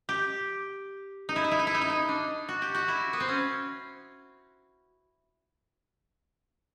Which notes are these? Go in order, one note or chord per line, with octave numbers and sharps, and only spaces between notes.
G4
D#4
E4
D#4
E4
D#4
E4
D#4
E4
D#4
D4
F#4
G4
F#4
E4
B3
C4
C#4